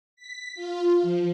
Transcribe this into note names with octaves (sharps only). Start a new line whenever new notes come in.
B6
F4
F3